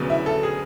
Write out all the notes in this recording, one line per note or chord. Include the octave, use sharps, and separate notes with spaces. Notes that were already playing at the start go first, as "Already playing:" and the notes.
Already playing: D2 C#3 F#3 B3
E4
A4
G#4